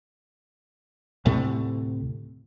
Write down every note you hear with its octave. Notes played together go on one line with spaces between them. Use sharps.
D2 A2 C3 A3